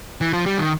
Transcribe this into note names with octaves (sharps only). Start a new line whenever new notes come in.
E3
F3
G3
D#3